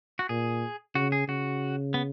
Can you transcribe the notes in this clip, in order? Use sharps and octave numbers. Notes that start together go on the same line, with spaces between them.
F#4
A#2 G#4
C#3 F#4
G#4
C#3 F#4
B3